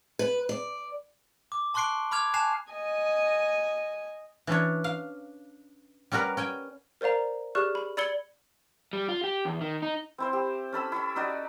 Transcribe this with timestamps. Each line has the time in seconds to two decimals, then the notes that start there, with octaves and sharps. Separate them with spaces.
0.19 B4
0.49 D5
1.52 D6
1.74 A5 C6 C#6 F#6 C7 D7
2.11 B5 D6 F6 G#6 F7
2.34 G#5 A5 F#6 C7 E7 F7
2.72 D#5 G#5
4.47 E3 C#4 D4 C#5
4.84 F5
6.12 G3 C#4 F#4 A#4 B4
6.37 C#4 G5 G#5
7.01 A#4 C5 D5 F5 A#5
7.55 G4 G#4 D5 C#6 F6 F#6
7.75 B5
7.97 D5 B5 E6 G#6 C#7 G7
8.93 G3
9.09 F4
9.24 G4
9.45 E2
9.61 D#3
9.82 D#4
10.18 C4 E4 C5
10.33 G4
10.73 C#4 A4 B5 E6
10.92 E4 C#5 B5
11.16 C#4 D#4 F#4 D5